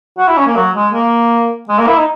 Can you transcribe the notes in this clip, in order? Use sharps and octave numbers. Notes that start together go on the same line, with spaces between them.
F#4
E4
C#4
A#3
F#3
G#3
A#3
G#3
A#3
E4
D#4